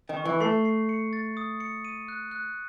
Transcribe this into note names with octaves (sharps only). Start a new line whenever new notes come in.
D#3
C#6
E3
A3 C7
C7
C#7
A6
D#6
C#7
D#7
F#6
F#6